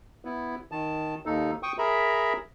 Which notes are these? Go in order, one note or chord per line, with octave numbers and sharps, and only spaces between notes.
B3 E4
D#3 A5
D#2 D#4 A4
G5 C#6 D#6
G#4 A#4 E5 A#5 B5